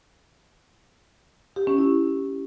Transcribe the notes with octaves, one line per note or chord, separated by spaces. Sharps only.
G4
C#4
E4